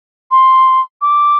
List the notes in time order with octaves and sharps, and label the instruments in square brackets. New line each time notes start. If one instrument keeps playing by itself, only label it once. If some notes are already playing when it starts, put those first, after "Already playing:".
[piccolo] C6
D6